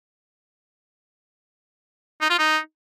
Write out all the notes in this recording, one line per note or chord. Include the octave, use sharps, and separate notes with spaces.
D#4
F4
D#4